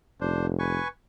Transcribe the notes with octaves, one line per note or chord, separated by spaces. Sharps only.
F1 D4 C5
B4 G#5 C#6